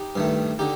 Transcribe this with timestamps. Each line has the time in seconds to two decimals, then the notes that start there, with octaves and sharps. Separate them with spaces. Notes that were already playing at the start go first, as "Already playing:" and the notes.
Already playing: D#4 G4
0.16 G2 D#3 A3
0.59 D3 D#4 G4